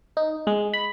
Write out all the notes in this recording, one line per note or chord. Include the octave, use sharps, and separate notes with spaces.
D#4
G#3
B5